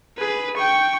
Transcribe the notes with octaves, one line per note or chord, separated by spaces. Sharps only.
G#4 B4
G5 C#6